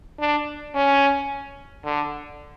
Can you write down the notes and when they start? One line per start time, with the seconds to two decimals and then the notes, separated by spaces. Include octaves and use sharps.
0.20 D4
0.75 C#4
1.85 D3